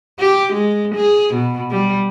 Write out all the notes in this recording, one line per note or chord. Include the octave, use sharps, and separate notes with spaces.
G4
G#3
G#4
B2
G3